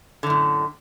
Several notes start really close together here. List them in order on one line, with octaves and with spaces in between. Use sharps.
D3 F#2 A2